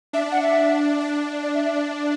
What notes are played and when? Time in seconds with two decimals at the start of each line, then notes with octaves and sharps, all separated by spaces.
0.13 D4 E5
0.32 F#5
0.42 E5
1.01 D4
1.43 D5
1.55 E5
1.65 E5
1.75 D5